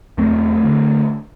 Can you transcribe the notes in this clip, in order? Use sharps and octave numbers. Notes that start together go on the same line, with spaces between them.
E2 A3 C4
D3